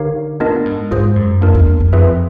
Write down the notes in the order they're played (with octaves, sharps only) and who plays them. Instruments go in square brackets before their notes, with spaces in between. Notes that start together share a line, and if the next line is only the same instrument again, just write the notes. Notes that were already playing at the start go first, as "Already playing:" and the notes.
Already playing: [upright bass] D3 [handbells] D#4 G4 A#4 C#5 F5
[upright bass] A2 [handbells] B3 D4 F4 A#4 D#5
[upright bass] G#2
[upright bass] G#2 [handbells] F4 G#4 C5
[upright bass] F#2
[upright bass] F2 [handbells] A#3 D4 F4 A#4
[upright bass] E2
F#2
[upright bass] F2 [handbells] C4 F4 G#4 B4 E5